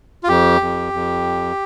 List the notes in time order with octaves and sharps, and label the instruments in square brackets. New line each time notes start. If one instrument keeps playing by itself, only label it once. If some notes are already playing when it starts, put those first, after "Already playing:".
[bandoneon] F4
F2 G4
F2
F2